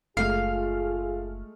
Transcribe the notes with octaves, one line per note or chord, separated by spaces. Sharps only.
F#1 G#3 A3 F4 G#4 F5 F6